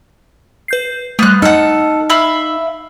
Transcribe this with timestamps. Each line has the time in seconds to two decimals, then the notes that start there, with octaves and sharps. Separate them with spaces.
0.68 B4 G6 C7
1.19 G3 A3 B3 F5 F#6
1.42 D#4 A4 F#5 F6
2.10 E5 F5 B5